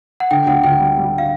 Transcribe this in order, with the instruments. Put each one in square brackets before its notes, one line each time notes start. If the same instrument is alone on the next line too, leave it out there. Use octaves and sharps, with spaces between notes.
[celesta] F#5
[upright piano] D3 [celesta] G5
[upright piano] D2 [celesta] F#5
[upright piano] D2 [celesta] G5
[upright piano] G3
G3
[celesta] F5